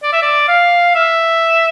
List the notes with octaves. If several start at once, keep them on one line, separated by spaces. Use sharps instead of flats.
D5
E5
D5
F5
E5